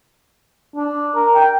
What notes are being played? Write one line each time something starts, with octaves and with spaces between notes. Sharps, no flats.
D4
A#4
G5